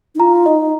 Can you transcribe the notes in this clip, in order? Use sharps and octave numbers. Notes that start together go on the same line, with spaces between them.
D#4
F4 A#5
D#4 D#5